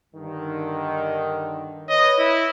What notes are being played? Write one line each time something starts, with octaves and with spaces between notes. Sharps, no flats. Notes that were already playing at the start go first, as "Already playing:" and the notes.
G2 D3 D#3
B4 C#5 D#5
E4